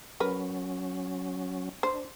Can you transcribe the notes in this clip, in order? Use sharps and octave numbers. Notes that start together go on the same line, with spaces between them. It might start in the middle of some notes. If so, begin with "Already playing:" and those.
F#3 C#4 A#4 B4
D4 C5